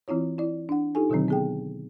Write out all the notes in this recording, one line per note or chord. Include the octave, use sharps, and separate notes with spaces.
E3 C4 E4 F4 C#5
E4 D5
D4 F#5
D#4 F4 G4 A4 G#5
B2 D3 D#3 F#3 C4
B3 G#4 G5